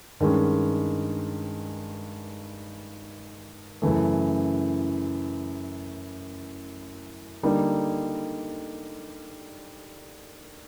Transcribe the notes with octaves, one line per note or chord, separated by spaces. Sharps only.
G2 D#3 G#3 C#4
F#2 C#3 E3 A3
D3 G3 A#3 D#4